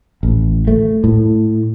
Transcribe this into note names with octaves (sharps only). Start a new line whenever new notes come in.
A1
A3
A2